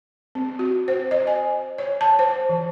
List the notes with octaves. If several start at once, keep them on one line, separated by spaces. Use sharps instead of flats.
C4
F#4
C5
D#5
G#5
C#5
A5
C5
E3